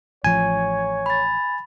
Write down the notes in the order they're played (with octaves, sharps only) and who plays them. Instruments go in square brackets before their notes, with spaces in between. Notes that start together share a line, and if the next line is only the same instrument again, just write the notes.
[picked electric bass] A1 F3 [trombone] C#5 [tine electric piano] G#5
[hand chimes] B5 A6